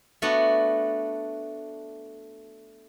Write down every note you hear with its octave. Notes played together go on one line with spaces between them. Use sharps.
A3 B3 D4 F#4